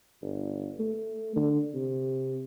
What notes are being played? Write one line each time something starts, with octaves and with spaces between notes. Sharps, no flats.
G1
A3
D3
C3